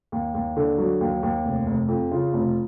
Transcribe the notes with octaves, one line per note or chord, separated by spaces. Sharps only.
D#2
D#2
D3
F#3
D#2
D#2
F1
F1
F2
C#3 F4
F1